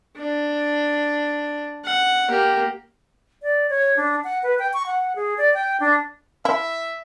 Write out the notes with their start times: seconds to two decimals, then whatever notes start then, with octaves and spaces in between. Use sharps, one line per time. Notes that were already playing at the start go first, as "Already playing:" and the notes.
0.17 D4
1.84 F#5
2.29 A#3 G4
3.43 D5
3.70 C#5
3.97 D4
4.24 F#5
4.43 B4
4.59 G5
4.73 C#6
4.86 F#5
5.16 G#4
5.38 D5
5.54 G5
5.80 D4
6.45 E4 E5